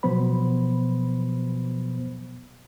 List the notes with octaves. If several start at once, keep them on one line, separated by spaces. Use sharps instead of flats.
B2 F3 F#3 B3 C5 B5